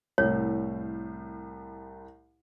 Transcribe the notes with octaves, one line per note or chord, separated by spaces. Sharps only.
C2 A2 C#5